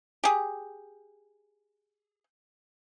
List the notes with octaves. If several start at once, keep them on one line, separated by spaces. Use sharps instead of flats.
G4 G#4